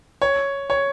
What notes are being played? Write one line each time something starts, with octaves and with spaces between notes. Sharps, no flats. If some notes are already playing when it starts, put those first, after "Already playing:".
C#5
C#5